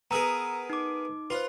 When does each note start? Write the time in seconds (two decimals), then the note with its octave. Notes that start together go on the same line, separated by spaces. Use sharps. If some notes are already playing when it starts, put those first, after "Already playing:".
0.11 B3 G#4 A#4 A#5 E6
0.70 D#4 D6
1.30 F4 B4 C5